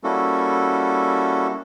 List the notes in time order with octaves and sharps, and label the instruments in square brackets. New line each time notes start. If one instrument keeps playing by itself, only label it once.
[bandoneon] G3 A#3 C#4 E4 F#4 A4